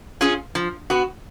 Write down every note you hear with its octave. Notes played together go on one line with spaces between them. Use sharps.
C#4 F4 G#4
F3
B3 F#4